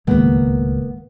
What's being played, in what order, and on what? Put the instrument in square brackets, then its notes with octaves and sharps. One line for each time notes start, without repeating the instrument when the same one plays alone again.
[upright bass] D1 C#2 [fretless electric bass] G#2 D#3 [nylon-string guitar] A#3 B3 A#4